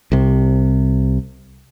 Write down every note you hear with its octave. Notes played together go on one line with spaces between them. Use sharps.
C2 C3